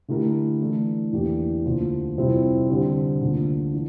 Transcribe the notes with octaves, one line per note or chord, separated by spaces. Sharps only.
D3 A3 E4 G4 A#4
E3 A3 D4 A4
E2 E3 A#3 D4 G4
D2 D3 F3 A#3
F2 C3 G3 C4 E4
D3 G3 C4 G4
D2 D3 F3 A#3
E3 D4